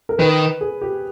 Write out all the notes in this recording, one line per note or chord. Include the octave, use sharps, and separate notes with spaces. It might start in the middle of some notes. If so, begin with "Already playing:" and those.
A#4
D#3 B4
G#4
G4